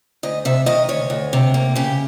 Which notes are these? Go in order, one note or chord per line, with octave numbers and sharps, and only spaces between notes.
D2 D#5
C3 E5
D#3 D#5
D2 C#5
D2
C3
A#3
C#3 G4